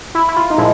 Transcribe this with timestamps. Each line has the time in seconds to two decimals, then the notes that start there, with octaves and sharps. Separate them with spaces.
0.15 E4
0.28 E4
0.36 F4
0.50 D#4
0.58 A#2 F3 G#3 E4